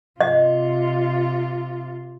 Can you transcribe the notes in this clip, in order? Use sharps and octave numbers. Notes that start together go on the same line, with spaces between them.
C3 F4 D#5